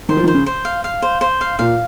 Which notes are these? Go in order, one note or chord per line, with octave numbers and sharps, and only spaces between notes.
D#3 C5
F3
D#3
C5
C#3
C5
F5
F5
C5
C5
F5
A#2 F5